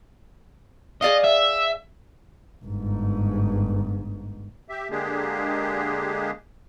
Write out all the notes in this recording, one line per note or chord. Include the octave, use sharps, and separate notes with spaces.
G#4 D5 D#5 F5
E5
G1 G#2
G4 E5
D3 G#3 A#3 D4 G4 G#4